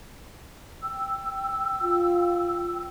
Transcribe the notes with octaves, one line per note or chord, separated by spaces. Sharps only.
G5 E6
F4